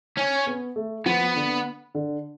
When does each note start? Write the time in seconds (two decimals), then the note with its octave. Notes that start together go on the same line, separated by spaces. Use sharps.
0.17 C#4
0.47 B3
0.76 A3
1.06 F3 B3
1.36 D3
1.95 D3